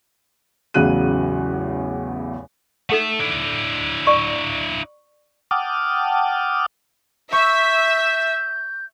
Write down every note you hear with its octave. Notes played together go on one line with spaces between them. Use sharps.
A1 E2 C#3 F#3 F#6 D#7
A3 D#4 A4 E5 F#5
D4 E4
D5 C#6
F#5 G5 A5 D6 D#6 F6
E5 C#6 G6